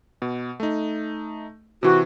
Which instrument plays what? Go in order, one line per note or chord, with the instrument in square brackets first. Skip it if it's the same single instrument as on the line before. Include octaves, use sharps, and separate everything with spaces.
[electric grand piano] B2
A3 D#4
[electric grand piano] C3 E3 [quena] F#4